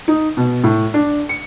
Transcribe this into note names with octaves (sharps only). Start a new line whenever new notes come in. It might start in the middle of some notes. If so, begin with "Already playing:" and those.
D#4
B2
A2
D4
C#7